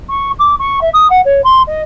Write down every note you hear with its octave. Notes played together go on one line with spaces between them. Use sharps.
C#6
D6
C#6
E5
D#6
F#5
C#5
C6
D#5